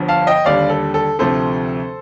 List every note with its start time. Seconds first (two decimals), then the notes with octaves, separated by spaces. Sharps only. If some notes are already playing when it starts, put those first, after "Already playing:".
Already playing: G1 G2 F3
0.08 F5 A5
0.27 D#5 G5
0.45 D#2 D3 G3 D5 F5
0.70 A4
0.94 A4
1.19 D2 C3 F3 A4 C5